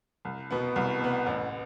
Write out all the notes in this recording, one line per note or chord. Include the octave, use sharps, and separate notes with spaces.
C2
B2 B3
C2
B2 B3
A1